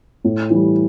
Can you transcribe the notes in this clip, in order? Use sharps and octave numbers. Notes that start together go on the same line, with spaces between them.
A2
E3 G3